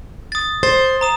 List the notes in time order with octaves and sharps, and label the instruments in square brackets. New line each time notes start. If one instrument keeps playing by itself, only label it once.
[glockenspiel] D#6 A6
[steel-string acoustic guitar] C5 [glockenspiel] A6
[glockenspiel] A#5 D#6 E7